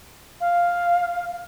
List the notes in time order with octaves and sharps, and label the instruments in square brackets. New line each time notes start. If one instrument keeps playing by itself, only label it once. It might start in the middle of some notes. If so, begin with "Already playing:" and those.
[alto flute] F5